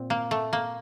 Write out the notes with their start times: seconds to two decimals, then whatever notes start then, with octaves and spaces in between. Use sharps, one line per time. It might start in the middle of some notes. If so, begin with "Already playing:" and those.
Already playing: A#2 C4
0.10 A#3
0.31 A3
0.53 A#3